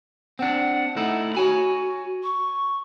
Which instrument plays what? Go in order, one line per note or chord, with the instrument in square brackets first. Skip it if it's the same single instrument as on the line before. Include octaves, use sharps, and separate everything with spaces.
[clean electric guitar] C4 D4 [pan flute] F#5
[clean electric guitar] A3 D#4 E4
[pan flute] F#4 [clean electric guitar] C#5 G#5 B5
[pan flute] C#6